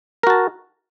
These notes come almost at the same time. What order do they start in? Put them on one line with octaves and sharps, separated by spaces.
A#4 F#4 A5